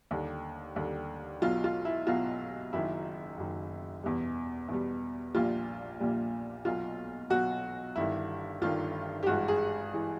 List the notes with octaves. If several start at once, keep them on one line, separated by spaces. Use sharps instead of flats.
D#2 D3 G3
D#2 D3 G3
B1 B2 F#3 F4
F4
E4
B1 B2 F#3 F4
F#1 F#2 D#3 E4
F#1 F#2 D#3
E2 B2 G3
E2 B2 G3
A#1 A#2 G3 F4
A#1 A#2 G3
B1 B2 F#3 F4
B1 B2 F#3 F#4
G1 G2 D#3 E4
G1 G2 D#3 F4
G4
G#1 G2 E3 G#3 F#4
G#4
E3 G#3